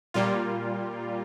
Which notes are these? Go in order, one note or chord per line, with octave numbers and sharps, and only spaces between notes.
A#2 G3 A#3 F4